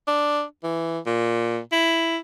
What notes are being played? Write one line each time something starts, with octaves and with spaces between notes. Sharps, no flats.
D4
E3
A#2
E4